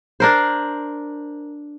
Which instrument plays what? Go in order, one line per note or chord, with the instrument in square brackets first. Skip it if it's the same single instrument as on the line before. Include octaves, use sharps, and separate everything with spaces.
[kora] D4 A#4 C5